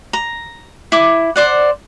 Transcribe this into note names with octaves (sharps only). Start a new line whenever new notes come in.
A#5
E4 D6
C5 D5 F#5